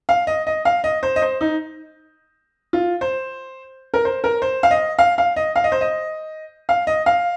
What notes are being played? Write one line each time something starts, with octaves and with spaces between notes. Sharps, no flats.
F5
D#5
D#5
F5
D#5
C5
D#5
C5
D#4
F4
C5
A#4
C5
A#4
C5
F5
D#5
F5
F5
D#5
F5
D#5
C5
D#5
F5
D#5
F5